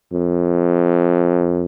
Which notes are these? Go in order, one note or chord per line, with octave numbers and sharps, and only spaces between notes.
F2